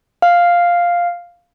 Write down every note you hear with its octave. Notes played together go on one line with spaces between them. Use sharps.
F5